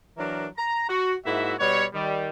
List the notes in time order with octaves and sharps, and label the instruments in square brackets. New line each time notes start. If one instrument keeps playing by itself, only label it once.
[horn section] E3 F#3 D4 A#4
A#5
F#4
G#2 A#3 E4 F#4 E5
B2 G3 B3 C#5
D#3 G3